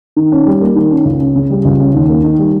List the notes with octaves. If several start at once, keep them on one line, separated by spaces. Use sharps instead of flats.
D#3
C#4
G3
A#3
D#3
C#4
C#2
C#4
C#3
G3
C#2
C#4
D#2
A#3
D#3
G3